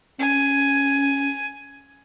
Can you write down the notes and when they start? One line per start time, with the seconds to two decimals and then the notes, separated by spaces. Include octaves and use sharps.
0.20 C#4 G#5